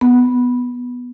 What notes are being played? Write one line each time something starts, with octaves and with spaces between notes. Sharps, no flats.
B3